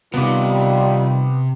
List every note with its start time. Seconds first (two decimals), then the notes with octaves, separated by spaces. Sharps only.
0.14 C3 D#3 G3 B3 F4 D6